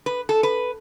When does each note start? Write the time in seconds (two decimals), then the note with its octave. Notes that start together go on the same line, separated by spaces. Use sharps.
0.06 B4
0.29 A4
0.43 B4